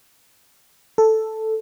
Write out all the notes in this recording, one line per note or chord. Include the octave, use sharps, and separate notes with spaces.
A4